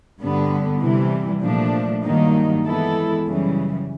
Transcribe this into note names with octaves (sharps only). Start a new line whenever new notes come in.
G2 D3 G3 B3
C3 E3 G3
A#2 F3 A3 D4
G2 D#3 F#3 A#3 D#4
E3 G#3 B3 E4 A4
F#2 C#3 E3 G3